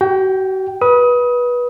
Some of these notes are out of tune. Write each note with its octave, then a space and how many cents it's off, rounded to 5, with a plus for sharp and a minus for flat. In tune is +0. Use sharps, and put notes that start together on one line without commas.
F#4 +40 G5 +0
B4 -20 D#6 +25